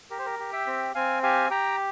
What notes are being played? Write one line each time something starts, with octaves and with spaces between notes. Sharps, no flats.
G4 A#4
C5
A#4
G4
E5 G5
C4
C4 F5 G#5
G4 F5 G#5
G4 G5 A#5